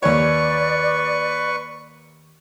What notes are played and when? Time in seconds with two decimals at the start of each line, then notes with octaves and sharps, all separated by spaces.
0.03 D#2 B4 C#5 D5 C#6